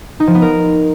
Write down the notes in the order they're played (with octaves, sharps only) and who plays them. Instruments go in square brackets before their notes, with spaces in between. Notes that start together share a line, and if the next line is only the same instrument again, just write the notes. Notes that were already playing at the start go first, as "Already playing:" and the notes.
[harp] D#4
F3
B3
A#4